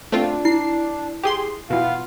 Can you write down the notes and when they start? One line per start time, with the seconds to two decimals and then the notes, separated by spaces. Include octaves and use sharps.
0.12 A3 C4 D4 F4
0.45 E4 C7
1.23 G4 G#4 C6
1.70 B2 E3 B3 F4 F5